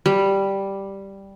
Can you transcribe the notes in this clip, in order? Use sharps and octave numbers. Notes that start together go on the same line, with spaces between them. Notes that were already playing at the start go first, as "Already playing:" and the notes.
G3